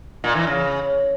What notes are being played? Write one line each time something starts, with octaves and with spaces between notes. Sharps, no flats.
A#2
E3
C#3